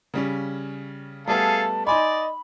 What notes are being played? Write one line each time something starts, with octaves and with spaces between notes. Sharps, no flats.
C#3 G3 C#4
G3 A3 B3 G#4 A4 F5 A5
D#4 D5 D#5 G#5 B5 C6